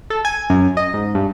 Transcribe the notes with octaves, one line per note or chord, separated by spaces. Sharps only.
A4
G#5
F#2
D#5
G#2
G2